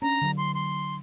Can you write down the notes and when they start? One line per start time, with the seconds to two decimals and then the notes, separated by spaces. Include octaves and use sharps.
0.02 C#4 D4 A#5
0.21 D3 F#3 D4
0.37 C6
0.55 C6